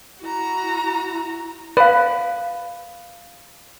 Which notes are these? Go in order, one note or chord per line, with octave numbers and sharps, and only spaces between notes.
E4 F#4 A#5
B4 D5 F5